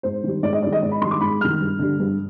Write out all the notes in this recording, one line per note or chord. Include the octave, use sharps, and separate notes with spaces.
G#2 C5
D#3 G3
G#2 D5
D#5
D#3 G3 D5
D#5
G#2 D5
B5
D#3 G3 C6
D6
G#2 B5
D#3 G3 F6
G2
D3 G3
G2